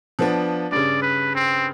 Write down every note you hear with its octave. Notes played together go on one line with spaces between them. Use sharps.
F3 B3 D4
G2 C#3 D5
B4
C4